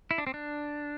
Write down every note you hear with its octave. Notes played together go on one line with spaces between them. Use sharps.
E4
D4
C4
D4